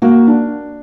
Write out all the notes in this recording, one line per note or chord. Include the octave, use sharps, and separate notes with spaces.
A#3 F#4
D4